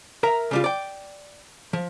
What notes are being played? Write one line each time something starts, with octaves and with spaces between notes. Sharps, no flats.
A#4 E5 A#5
C#3 G3 F4
D5 G5
F3